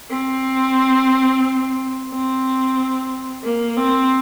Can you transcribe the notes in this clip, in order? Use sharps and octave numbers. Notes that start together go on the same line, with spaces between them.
C4
C4
A#3
C4